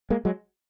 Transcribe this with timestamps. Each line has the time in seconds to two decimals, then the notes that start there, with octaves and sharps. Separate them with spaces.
0.10 G#3 A#3
0.25 F#3 G#3